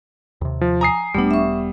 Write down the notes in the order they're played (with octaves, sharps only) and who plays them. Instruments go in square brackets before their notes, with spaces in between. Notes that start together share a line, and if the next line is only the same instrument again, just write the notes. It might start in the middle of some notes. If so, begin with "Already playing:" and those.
[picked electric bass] D#2 C3
[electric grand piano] F3
[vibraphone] G#5 [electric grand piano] A#5 D#6 C7
[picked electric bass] E1 B3 [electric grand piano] G3 [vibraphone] A3 D4
[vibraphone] E5 C#6